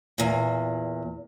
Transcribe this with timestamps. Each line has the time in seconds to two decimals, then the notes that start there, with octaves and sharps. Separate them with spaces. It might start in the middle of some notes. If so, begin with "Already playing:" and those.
0.18 E2 A#2